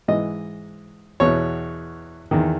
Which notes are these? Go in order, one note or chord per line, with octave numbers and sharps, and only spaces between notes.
G#2 E3 D#5
E2 B2 C#5
E2 D#3